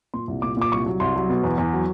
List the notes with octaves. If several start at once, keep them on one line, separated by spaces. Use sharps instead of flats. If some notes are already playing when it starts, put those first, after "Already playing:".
A#2 C6
C2
A#2 D6
A#2 D6
C2 C#6
F#3
C2 C6
F#3
B2
E2
E2
F#3